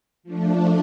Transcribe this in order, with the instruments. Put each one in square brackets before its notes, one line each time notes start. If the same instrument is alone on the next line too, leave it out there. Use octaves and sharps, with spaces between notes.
[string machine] F3 A3 D4